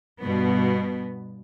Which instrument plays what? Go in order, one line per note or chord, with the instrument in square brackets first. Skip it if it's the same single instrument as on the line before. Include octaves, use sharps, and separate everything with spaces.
[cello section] G2 B2 B3